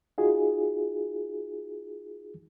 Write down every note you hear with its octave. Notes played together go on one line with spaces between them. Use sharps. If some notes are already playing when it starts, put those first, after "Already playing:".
D#4 F4 F#4 G#4